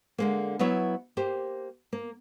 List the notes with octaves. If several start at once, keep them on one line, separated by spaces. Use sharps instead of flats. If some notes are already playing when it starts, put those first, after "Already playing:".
D3 G#3 A#3
F#3 B3 E4 C#5 E5
A#3 G4 C5
A#3